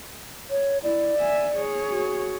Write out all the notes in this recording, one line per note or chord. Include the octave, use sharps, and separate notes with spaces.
C#5
E4 D5
E5 G#5
G#4 C#5
F#4